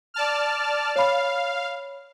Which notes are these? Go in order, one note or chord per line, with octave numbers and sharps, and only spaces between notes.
D5 A5 F6
C#5 F5 B5